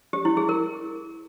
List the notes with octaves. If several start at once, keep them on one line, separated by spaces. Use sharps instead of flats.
G4
E4
G#4
A#4